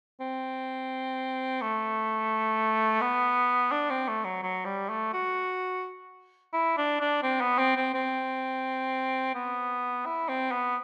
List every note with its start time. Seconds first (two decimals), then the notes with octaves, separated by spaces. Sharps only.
0.21 C4
1.62 A3
3.01 B3
3.72 D4
3.90 C4
4.08 A3
4.24 F#3
4.43 F#3
4.65 G3
4.89 A3
5.13 F#4
6.53 E4
6.78 D4
7.01 D4
7.23 C4
7.41 B3
7.58 C4
7.77 C4
7.94 C4
9.35 B3
10.06 E4
10.29 C4
10.52 B3